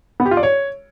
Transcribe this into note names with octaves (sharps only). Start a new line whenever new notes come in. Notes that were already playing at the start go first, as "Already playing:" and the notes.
B3
G4
F4
D5
C#5